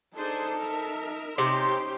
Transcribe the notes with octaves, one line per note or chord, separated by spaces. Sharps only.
D4 D#4 G#4 A4 C5
A#4 E5
C3 C#4 D#4 G4 C5 C6